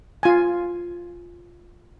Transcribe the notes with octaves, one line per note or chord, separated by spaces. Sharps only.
F4 G#5